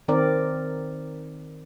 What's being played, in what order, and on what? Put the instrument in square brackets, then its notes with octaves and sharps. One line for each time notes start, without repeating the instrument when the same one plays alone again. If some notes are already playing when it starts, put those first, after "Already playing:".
[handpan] D#3 C4 A#4 D5